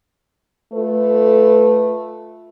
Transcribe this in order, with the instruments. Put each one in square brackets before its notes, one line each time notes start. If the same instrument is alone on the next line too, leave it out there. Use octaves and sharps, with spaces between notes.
[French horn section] A3 F4 A4 B4